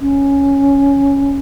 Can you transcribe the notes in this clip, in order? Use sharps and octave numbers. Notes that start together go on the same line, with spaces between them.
C#4